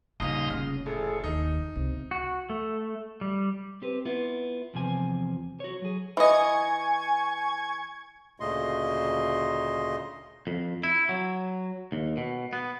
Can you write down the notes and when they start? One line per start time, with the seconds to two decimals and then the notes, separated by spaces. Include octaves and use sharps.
0.20 D#1 C#3 C#4 D#4 F4 A#5 C6 D#6
0.50 F1 C#3 F6
0.86 A1 G#4 A4
1.24 D#2 D#4
1.76 C#2 C3
2.11 F#4
2.50 A3
3.21 G3
3.82 C4 G4 B4
4.05 B3 E4 F4
4.74 E2 C3 F3 G#5
5.60 F#4 C#5
5.82 F#3 G#4
6.17 E3 D#5 G#5 C#6 G#6
8.40 D2 A#2 C#3 A3 D#5 C6
10.47 F2
10.83 E4
11.09 F#3
11.92 D#2
12.17 B2
12.53 B3